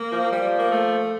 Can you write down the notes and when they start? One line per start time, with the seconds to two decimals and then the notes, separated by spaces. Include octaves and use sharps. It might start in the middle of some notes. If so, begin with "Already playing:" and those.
Already playing: A#3
0.12 F3
0.32 G3
0.59 A#3
0.71 A3